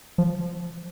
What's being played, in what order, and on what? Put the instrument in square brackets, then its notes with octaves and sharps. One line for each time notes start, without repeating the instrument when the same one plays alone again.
[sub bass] F3